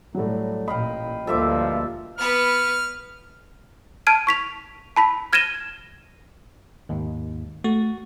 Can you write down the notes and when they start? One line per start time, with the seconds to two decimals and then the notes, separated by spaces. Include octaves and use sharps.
0.15 A2 F#3 G3 A3
0.68 A1 A#2 D#5 F5 G5 B5
1.27 D2 G2 F3 A#3 A4 E5 D6
2.18 B3 B4 F6
4.07 A5 F6 G#6 D7 D#7
4.27 C#6 B6 F7
4.96 A5 B5 B6
5.33 F6 G#6 A#6 D#7 E7 G7
6.89 D#2 G#2
7.64 A3 F#4